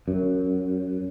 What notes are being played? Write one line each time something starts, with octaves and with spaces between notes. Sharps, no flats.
F#2